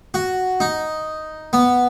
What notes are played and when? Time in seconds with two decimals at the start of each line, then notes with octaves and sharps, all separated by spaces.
0.14 F#4
0.60 D#4
1.53 B3